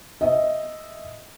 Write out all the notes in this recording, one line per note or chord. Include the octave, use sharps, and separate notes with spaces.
D#5 E5